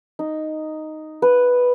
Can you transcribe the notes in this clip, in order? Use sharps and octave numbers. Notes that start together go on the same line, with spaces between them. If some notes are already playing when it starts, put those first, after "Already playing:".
D#4
B4